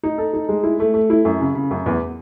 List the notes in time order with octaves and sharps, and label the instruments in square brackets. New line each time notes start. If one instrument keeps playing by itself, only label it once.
[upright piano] D#4
A4
D#4
G#3
E4
A3
A3
E4
F#2
C#3
C#3
F#2
E2